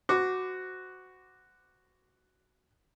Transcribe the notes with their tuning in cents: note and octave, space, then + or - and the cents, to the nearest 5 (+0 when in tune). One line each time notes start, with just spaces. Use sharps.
F#4 +0 C5 -35 D6 +0